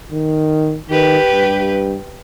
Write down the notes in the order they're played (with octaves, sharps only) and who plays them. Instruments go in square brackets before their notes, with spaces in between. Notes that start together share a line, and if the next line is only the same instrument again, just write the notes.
[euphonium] D#3
[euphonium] D#3 [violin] G4 B4
[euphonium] G2